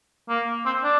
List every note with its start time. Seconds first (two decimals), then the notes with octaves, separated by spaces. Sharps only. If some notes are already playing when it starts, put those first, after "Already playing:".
0.29 A#3
0.66 C4
0.84 D4